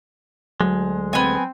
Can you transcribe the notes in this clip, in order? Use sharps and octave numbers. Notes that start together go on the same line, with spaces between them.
D2 F#3 G#3
B3 C4 G#5